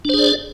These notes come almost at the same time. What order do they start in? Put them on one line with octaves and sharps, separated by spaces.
D4 C5 G#4 D5